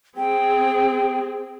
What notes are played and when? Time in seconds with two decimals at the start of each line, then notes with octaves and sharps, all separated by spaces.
0.17 C4 G#4 G5